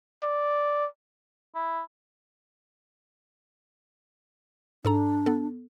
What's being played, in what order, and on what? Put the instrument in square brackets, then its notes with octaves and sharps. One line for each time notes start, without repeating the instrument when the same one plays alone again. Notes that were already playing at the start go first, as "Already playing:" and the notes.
[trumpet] D5
[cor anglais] E4
[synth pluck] G#2 A4 A#5 [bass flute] D4
[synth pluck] B3 A4